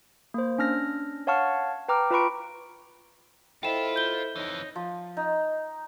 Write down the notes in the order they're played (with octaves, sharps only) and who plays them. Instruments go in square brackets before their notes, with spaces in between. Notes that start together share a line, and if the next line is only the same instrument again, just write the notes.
[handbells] A#3 C5
C#4 D4 F6 A#6
C#5 F5 F#5 A5 C#6 F6
B4 G5 A#5 D6 F6
F4 B4 A#5 B5 C#6 D7
[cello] E4 [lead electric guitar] F4 F5 [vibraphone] A4 C5 D#5 [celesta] G5 E7
[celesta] G6 G7
[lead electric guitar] F2 E3 [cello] D#4 [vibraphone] C#5
[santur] F3
D#4